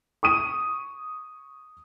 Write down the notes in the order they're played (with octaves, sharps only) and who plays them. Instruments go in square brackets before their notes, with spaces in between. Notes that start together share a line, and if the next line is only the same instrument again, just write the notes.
[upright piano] C#6 D#6 D#7